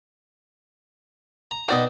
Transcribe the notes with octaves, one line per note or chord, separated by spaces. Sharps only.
A#5
B2 D#3 F#4 D5 D#5